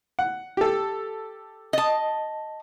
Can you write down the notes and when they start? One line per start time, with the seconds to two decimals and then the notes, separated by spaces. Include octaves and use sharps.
0.19 F#5
0.57 G4 A4
1.73 D#5 A5